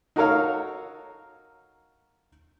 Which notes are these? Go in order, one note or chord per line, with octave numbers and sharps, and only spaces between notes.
D#4 F#4 A4 A#4 C#5 F5